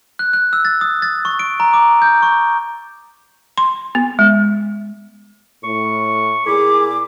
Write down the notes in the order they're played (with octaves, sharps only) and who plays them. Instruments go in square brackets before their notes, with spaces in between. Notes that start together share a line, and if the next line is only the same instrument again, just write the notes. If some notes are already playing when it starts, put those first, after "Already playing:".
[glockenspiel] F#6
F#6
E6
A6
D#6
A6
C#6
D7
A#5
D6
G6
C#6
[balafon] C6
B3
G#3
[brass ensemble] A2 [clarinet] C#6
[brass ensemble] A#2 G#4 [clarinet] E4 [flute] D6